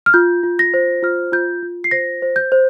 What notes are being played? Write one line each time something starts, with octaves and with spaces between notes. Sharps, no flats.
F6
F4 G6
F4
A#6
C5
F4 F6
F4 G6
F4
C7
C5 A#6
C5
G6
C5